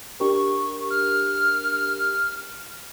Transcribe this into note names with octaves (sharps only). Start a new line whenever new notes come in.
D4 G4 A#4 C#6
F6